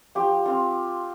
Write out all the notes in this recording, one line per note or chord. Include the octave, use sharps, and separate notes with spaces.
F3 G4
C4 F4